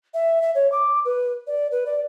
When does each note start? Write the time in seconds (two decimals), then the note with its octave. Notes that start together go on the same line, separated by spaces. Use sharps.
0.14 E5
0.42 E5
0.55 C#5
0.72 D6
1.05 B4
1.47 D5
1.71 B4
1.86 D5